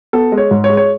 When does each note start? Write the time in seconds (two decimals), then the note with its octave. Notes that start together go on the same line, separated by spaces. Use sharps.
0.13 B3 A4
0.32 G#3
0.38 C#5
0.51 G#2
0.64 C#5
0.69 G#3
0.77 C#5